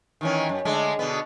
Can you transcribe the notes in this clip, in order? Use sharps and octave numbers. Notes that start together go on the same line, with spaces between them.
D#3 E3 C#4
F#2
D3 G#3 A3
B2 D3 B3